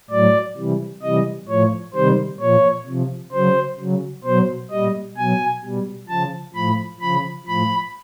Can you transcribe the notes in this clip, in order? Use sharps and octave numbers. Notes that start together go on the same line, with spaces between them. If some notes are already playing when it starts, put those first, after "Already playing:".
A2 F#3 D5
C3 E3 G3
C3 E3 G3 D#5
A2 F3 C#5
C3 D#3 G3 C5
A#2 F3 C#5
C3 F3
C#3 F#3 C5
C#3 F#3
B2 F#3 C5
A#2 G3 D#5
B2 F#3 G#5
B2 G3
C#3 F3 A5
A2 F3 B5
C#3 F3 B5
A2 F3 B5